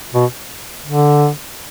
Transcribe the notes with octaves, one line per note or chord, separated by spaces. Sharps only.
B2
D3